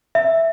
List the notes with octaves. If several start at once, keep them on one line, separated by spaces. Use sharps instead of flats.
E5